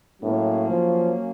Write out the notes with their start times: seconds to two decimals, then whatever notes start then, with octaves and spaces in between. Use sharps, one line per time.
0.22 A2 F#3 A#3 C#4
0.70 F3